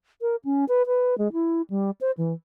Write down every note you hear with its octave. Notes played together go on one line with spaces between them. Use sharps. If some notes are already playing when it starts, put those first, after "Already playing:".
A#4
C#4
B4
B4
G#3
E4
G3
C5
E3